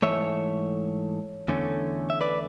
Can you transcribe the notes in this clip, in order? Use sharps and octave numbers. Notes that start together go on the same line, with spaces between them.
G#2 E3 A3 C#5 E5
E2 D3 A3 C#4
E5
B4 D5